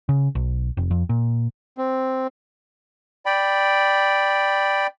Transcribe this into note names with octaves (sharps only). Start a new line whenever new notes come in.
C#3
B1
F1
F2
A#2
C4
D5 G5 B5